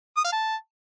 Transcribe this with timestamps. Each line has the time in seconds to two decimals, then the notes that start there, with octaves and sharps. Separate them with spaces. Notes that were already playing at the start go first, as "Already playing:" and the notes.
0.17 D#6
0.25 F5
0.32 A5